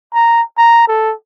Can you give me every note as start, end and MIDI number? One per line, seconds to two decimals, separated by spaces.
0.14 0.42 82
0.58 0.86 82
0.88 1.13 69